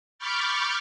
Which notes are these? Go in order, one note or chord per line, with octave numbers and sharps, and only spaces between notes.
B5 C#6 D6 F6 G6 A6